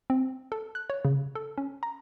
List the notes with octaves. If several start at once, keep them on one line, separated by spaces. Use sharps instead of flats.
C4
A4
F#6
C#5
C#3
A4
C#4
A#5